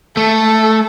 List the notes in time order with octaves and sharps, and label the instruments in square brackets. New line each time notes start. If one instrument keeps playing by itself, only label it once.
[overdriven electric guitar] A3 [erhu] A4